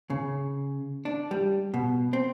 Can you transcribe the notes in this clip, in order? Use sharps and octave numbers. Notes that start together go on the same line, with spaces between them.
C#3
D4
G3
B2
C4